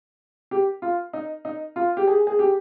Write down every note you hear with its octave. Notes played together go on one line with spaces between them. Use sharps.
G4
F4
D#4
D#4
F4
G4
G#4
G#4
G4